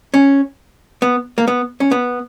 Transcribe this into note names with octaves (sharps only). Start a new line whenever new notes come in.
C#4
B3
A#3
B3
C#4
B3